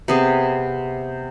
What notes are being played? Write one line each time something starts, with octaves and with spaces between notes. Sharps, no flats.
C3 B3 G#4